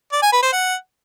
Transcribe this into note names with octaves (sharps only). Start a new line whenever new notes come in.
D5
G#5
B4
C5
F#5